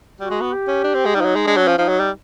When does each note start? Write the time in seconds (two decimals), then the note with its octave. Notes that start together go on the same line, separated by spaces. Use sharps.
0.20 G3 F#4
0.30 G#3
0.41 B3
0.52 G4
0.68 C#4
0.84 D4
0.94 C4
1.05 G#3
1.15 G3 D#4
1.21 F3
1.25 F#3
1.35 G#3
1.46 G#3 D4
1.57 F#3
1.62 C#4
1.67 F3
1.78 F3 D#4
1.88 F#3
1.99 G3